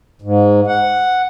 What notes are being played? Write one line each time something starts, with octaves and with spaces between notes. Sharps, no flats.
G#2
F#5